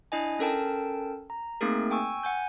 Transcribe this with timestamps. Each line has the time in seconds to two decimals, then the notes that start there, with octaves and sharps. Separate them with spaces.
0.12 D4 E4 D#5 G#5
0.39 C#4 A4 A#4 G5 A5
1.30 A#5
1.61 A3 A#3 C4 D#4 G#4 A#4
1.91 G5 G#5 C#6 E6
2.23 F#5 G#5 G6